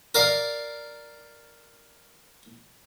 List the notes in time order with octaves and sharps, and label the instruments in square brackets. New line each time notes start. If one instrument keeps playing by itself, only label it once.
[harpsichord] A#4 D5 F5